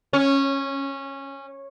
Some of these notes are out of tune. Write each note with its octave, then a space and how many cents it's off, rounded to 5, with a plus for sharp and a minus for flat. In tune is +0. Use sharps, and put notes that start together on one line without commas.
C#4 -15